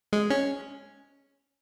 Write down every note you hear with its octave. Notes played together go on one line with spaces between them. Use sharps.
G#3
C#4